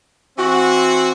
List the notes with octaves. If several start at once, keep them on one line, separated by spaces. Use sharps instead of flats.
E3 C4 F#4